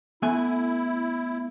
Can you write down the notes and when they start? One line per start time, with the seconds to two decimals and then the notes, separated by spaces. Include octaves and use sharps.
0.22 A3 B3 E4 G#5